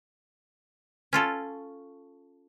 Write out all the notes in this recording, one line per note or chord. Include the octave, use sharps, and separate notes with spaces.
C#4 F4 A4